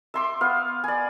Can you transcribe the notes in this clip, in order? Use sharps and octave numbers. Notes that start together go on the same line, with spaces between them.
E5 C6 D6
B3 F5
D5 G#5